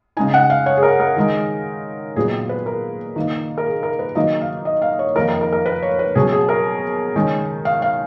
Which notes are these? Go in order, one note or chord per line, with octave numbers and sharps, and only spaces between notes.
C#3 G#3 D#4 G#5
F#5
F5
C#5
G#4
A#4
A#4
D#3 G#3 D#4
A#2 F#3 B3 D#4 G#4
B4
A#4
D#3 A#3 D#4
A#4
G#4
A#4
B4
D#3 F#3 A#3 D#4 D#5
F5
D#5
F5
C#5
F2 D#3 A#3 D#4 A#4
A#4
A#4
A#4
B4
C#5
B4
B2 F#3 C#4 G#4
G#4
A#4
D#3 G#3 C#4
F5
F5